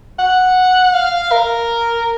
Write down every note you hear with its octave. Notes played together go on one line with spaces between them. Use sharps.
F#5
F5
A#4